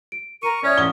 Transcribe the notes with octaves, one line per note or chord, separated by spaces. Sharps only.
D7
A#4 C#6 D#7
C#4 C#5 D5 E5 D#6
A1 C#6 D#6 G7